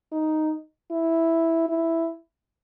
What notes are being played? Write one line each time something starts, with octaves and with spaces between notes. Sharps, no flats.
D#4
E4
E4